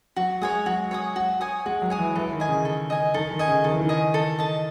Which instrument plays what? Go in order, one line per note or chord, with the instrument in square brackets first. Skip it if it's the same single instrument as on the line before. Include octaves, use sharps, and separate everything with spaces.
[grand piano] F#3 [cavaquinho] F#4
[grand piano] G#3 [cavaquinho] C#5 G#5 D#6
[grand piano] F#3 [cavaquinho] F#4
[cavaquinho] C#5 G#5 D#6
F#4
C#5 G#5 D#6
[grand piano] G#3 [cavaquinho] F#4
[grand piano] F#3
[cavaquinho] C#5 G#5 D#6
[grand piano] E3
[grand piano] E3 [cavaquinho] A4
[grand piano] D#3
[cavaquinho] D#5 G#5
[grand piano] C#3
[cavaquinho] A4
D#5 G#5
[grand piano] D#3 [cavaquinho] A4
[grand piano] D#3
[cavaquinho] D#5 G#5
[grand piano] C#3
[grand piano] D#3 [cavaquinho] A4
[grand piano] E3
D#3
[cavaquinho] D#5 G#5
A4
D#5 A5